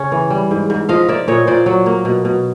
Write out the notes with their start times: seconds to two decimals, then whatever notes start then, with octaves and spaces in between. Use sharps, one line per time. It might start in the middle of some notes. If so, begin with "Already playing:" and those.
Already playing: C#3 C#4
0.12 E3
0.30 G3
0.51 G#2
0.70 G#2
0.89 F3 D#5 F5
1.08 A#3 D5 E5
1.28 A#2 C#5 D#5
1.47 A#2 C5 D5
1.66 F#3
1.86 A#3
2.05 B2
2.25 B2